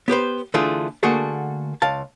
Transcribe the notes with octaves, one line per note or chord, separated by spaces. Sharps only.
B3 G4 B4 C5
D3 E3 A3 F4 G#4
D3 A3 A#3 F#4 G#4 A4
C#2 F5 A5